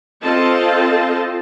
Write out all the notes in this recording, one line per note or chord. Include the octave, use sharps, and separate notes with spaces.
C4 F4 A4 C5 D#5 A5